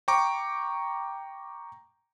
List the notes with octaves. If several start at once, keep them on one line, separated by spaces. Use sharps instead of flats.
G5 A#5 C#6 D6